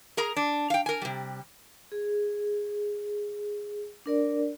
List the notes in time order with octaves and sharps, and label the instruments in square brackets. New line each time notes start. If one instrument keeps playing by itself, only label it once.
[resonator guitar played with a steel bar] G#4 A#4 A#5
D4
F5 G5
A#4 G#5
C3 G3
[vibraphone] G#4
D4 A#4 D5